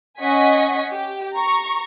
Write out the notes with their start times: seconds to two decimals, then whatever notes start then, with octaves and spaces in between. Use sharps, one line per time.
0.21 C#4 D#5 F#5 G#5 C#6 B6
0.92 G4
1.34 A#5 C#6